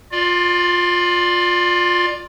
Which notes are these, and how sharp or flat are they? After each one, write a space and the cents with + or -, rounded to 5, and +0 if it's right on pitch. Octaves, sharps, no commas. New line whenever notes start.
F4 +15 D5 +20